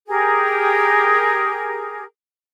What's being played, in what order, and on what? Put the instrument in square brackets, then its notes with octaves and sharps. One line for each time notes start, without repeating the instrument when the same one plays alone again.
[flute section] G4 G#4 A#4